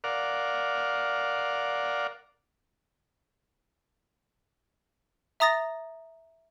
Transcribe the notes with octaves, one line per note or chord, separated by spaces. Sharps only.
A#4 D5 F5 F#5
E5 A#5 D#6 A6 A#6